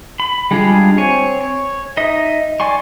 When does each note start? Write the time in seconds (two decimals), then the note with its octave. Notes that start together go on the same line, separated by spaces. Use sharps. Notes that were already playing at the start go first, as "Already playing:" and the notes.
0.20 B5
0.51 G3 G#3 D4 F4 G#4
0.97 C4 C#5 G#5
1.41 C#5
1.97 D#4 D#5 E5 D#6
2.60 D5 G#5 C6 C#6